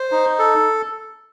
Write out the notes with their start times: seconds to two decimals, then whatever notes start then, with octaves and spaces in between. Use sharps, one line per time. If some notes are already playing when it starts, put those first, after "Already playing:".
Already playing: C5
0.12 D#4
0.39 A4